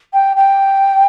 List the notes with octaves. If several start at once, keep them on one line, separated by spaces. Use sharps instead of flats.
G5
G5